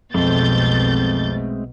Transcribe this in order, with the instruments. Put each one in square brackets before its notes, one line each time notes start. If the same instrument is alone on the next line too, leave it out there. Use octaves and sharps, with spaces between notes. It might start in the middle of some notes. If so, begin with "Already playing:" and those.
[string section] B1 G6 A6 [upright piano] F2 [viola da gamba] B2 [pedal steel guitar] G#3 A3 C4